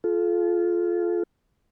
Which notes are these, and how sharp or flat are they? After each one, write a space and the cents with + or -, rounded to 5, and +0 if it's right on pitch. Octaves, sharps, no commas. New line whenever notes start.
F4 +0 A4 -35